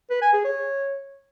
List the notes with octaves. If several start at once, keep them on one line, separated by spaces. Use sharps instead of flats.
B4
G#5
G#4
C#5